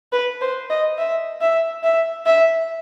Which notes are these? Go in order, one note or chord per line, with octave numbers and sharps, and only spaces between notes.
B4
C5
D#5
E5
E5
E5
E5